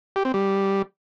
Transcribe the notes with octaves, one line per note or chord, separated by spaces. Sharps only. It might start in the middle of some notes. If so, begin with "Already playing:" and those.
G4
C4
G3